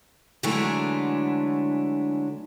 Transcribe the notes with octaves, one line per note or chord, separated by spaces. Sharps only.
D3 E3 F#3 G#3 A3 D4